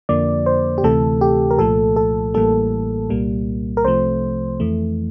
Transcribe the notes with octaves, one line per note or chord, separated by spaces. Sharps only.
F2 D3 F3 A#3 D5
C5
G4
D2 C3 E3 A3 A4
G4
A#4
C2 A#2 F3 A3 A4
A4
A1 A2 E3 G3 A#3 A4
C2 A#2 G3 A#3
A#4
C2 C3 F3 A3 C5
F2 E3 A3